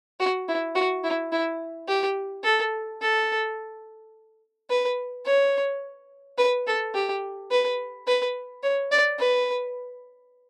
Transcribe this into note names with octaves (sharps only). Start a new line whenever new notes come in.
F#4
E4
F#4
E4
E4
G4
A4
A4
B4
C#5
B4
A4
G4
B4
B4
C#5
D5
B4